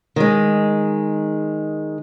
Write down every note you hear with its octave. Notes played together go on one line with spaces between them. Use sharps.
D#3 G#3